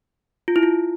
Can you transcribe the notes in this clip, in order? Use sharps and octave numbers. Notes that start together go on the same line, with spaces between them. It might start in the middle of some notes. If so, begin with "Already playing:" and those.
F4
E4
F4